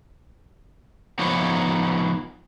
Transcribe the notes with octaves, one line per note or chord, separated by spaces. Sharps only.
F3 B3 D#4 C#5